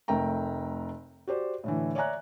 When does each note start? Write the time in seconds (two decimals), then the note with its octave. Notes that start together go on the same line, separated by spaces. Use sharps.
0.08 F1 A3 A#4 G5 A#5
1.27 F#4 G4 C5 D5
1.64 A2 D3 E3
1.95 C#5 D5 E5 G#5 A#5 F#6